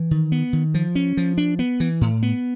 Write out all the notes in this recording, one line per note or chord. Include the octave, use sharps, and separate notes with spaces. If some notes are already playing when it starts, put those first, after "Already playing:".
Already playing: E3
D#3
B3
D#3
F3
C#4
F3
D4
B3
E3
A2
B3